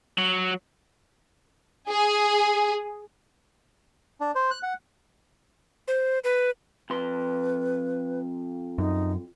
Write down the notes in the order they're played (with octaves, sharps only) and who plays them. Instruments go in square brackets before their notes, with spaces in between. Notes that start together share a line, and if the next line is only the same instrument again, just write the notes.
[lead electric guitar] F#3
[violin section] G#4
[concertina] D4
C5
F#6
F#5
[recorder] C5
B4
[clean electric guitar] F2 C6 [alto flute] B4
[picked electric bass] F#2 [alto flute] D#4